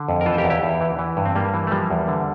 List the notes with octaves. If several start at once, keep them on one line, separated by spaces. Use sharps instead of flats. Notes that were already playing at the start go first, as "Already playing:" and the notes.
Already playing: D3
F2
A#4
E3 F4 A4
C5
G4 A#4
E2
E4 G4
E2
E3
E3
G2
C4
G2 G3 A#3
E3
A3
F3 G3 A#3
E2
D3